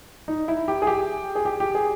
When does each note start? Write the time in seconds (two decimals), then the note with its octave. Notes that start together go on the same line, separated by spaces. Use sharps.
0.28 D#4
0.48 E4
0.68 G4
0.82 G#4
0.87 G4
1.35 G#4
1.45 G4
1.60 G4
1.75 G#4